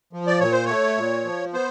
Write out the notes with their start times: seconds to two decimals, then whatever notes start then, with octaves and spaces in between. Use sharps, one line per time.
0.13 F3
0.27 D5
0.40 A#2 C#5
0.52 C5
0.65 A3 C#5
0.97 A#2
1.25 F3
1.53 B3 C5